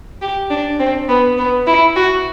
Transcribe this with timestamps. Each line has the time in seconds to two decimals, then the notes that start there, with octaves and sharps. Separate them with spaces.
0.21 G4
0.50 D4
0.80 C4
1.09 B3
1.38 B3
1.67 E4
1.96 F#4